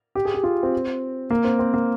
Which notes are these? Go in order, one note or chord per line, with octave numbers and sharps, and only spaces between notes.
G4
G#4
G4
F4
C4
A#3
C4
C4
A#3